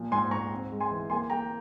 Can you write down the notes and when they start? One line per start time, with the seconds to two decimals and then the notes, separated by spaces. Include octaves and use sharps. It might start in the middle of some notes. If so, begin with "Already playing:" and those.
Already playing: A#2 F3
0.12 G#2 G#5 C6
0.31 G#2 A#5 C#6
0.51 C4
0.72 G#3
0.80 G#5 C6
0.91 E3
1.10 A#3 G#5 C6
1.30 A#3 G5 A#5